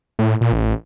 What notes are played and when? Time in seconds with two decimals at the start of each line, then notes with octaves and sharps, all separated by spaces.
0.19 A2
0.41 A#2
0.53 A1